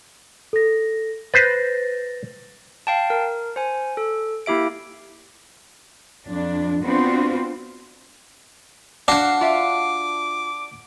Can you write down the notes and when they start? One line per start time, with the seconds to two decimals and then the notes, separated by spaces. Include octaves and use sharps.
0.53 A4 A#6
1.34 B4 C5 A6 A#6
2.87 F5 G5 A5
3.10 A#4
3.56 C5 G#5
3.97 A4
4.46 A#3 E4 G4 E5 D7
6.27 F2 D4
6.83 B3 C4 D4 F4 F#4 C5
9.08 D4 F#4 F5 F#5
9.41 F4 E5 F5 D6